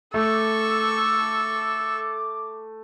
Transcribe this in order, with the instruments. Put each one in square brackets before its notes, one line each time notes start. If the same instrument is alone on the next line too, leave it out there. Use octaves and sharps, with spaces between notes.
[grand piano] A3 [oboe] A4 [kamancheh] C#6 E6 [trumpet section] D6